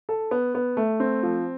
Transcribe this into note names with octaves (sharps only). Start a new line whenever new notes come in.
A4
B3
B3
A3
C4
F3